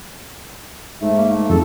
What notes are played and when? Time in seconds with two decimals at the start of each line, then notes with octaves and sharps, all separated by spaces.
1.01 G#2 A3 E5
1.17 A#3
1.30 A3
1.50 F2 G#4 A4